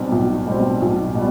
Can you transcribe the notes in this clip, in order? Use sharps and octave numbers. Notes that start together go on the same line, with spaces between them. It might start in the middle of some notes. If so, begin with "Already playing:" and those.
Already playing: B1 B2 G3 C4
B1
B2 G3 C4
B1
B2 G3